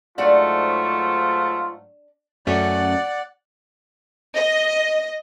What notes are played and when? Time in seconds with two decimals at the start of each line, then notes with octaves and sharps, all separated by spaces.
0.18 G#2 F#3 A3 D4 F4 D5 F#5
2.47 F#2 A3 C#4 D5 F#5
4.36 D#5